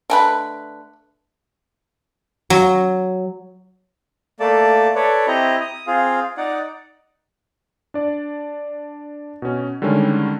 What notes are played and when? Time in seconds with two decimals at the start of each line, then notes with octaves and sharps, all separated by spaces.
0.10 D3 A3 B4 D#5 G#5 B5
2.50 F#3
4.40 A3 A#3 A4 D5 A5
4.95 A4 B4 C#5 D5
5.27 C4 E4 G4 D#5 A#5
5.61 D#6
5.87 C4 F4 G#4 F5
6.37 D#4 D5 F#5
7.94 D4 D5
9.42 B2 C#4
9.82 D3 D#3 G3 G#3 C#4